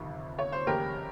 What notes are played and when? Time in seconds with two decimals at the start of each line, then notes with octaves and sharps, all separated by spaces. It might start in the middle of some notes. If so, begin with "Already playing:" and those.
Already playing: G1 F2 C3 D#3
0.39 C#5
0.52 C5
0.67 F1 D#2 C#3 G4 A#4